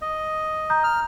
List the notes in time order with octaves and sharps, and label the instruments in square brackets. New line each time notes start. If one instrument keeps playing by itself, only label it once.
[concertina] D#5
[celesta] A#5 D#6 G6
[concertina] F6